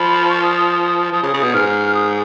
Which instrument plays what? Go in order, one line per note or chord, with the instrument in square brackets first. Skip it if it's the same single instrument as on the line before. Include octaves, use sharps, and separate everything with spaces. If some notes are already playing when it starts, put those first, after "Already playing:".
Already playing: [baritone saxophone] F3 [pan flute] B5
[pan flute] C#6
D#6
D#6
D#6
[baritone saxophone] F3 [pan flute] D#6
[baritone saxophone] C#3
[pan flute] D#6
[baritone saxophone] C#3
[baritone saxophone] B2 [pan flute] D#6
[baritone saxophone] G#2 [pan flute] F6
[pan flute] D#6